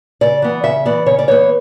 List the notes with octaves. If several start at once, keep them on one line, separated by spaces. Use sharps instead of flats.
C#3 D5
E3 B3
C#3 E5
E3 B3 D5
C#3 C#5
D5
E3 B3 C#5